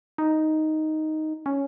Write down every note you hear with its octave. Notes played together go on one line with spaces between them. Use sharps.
D#4
C#4